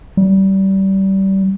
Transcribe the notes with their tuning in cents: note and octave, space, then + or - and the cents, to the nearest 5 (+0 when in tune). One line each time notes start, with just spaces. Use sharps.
G3 -25